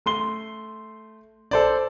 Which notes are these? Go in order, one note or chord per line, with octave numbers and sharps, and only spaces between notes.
A3 C6 G7
A4 C5 D5